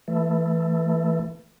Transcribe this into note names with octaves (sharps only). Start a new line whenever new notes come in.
E3 A3